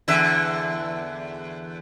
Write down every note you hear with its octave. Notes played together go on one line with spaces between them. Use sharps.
E2 D3 E5